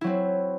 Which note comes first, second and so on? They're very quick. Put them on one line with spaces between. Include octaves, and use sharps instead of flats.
E4 F#3 C4